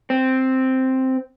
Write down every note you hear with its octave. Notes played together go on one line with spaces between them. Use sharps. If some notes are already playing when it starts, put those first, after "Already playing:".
C4